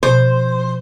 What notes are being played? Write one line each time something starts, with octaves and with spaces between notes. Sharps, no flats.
B2 F3 C5